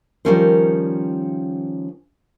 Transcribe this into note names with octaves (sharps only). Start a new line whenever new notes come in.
D#3 F3 G3 C#4 A#4 C5